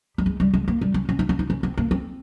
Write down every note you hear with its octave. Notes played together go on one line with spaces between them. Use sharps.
G3
G#3
G3
G#3
A#3
G3
C#4
C#4
D#4
C#4
D#4
C#4
C4
A#3
C4